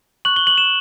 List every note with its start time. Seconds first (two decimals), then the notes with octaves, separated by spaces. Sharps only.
0.25 C#6 F#6 F#7
0.36 G7
0.47 F#7
0.58 E7